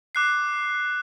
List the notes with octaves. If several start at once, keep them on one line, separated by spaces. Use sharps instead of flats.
D6 F#6 C7